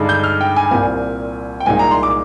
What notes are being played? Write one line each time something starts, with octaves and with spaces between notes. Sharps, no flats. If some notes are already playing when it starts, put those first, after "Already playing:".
Already playing: G2 D3 G#3 D#4
G6
F6
G5
G#5
C2 A#2 G3 C4 G#5
G5
C2 A#2 G#3 D#4 G#5
A#5
C6
D6